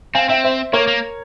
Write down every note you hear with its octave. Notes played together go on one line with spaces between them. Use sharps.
C4 F5 G#5
C4 E5 G5
C5 E5
A#3 A#4 C#5
A#3